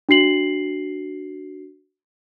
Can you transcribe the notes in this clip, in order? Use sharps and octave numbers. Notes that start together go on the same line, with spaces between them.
D4 F#4 C7 F#7